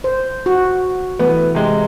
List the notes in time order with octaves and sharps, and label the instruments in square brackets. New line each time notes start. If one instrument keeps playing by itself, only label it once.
[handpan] C5
F#4
[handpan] E3 A3 [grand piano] B3
[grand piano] C3 G#3